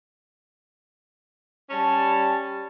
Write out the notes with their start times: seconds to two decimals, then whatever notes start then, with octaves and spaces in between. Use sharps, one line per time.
1.70 G3 C#4 G#5 A5